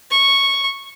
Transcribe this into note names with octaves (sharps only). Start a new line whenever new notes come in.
C#6